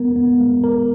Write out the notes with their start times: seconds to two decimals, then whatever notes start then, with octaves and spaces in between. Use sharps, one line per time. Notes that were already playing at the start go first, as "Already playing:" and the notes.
Already playing: G#3 B3 A#4
0.16 B3
0.40 G#3
0.64 A#4